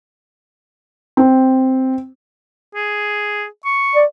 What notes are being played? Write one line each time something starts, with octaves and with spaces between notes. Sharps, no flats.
C4
G#4
C#6
D5